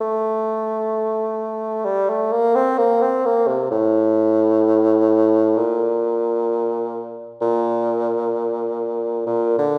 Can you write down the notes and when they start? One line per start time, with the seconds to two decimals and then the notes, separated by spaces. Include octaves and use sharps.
0.01 A3
1.85 G3
2.09 A3
2.32 A#3
2.55 C4
2.78 A#3
3.02 C4
3.26 A#3
3.48 C3
3.71 A2
5.57 A#2
7.41 A#2
9.27 A#2
9.58 D3